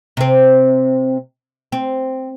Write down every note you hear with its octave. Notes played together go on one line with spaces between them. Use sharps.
C3 C4
C4